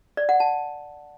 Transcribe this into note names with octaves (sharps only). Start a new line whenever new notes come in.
D5
F#5
A5